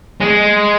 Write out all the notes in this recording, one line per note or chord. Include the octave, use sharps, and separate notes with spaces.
G#3